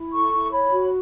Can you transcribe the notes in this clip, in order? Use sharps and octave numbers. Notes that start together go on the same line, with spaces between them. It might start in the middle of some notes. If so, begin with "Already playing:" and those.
Already playing: E4
A4 C#6
E4
C#5 B5
F#4